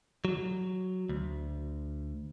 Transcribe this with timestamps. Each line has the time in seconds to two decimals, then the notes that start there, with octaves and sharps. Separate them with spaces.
0.25 F#3
1.09 D2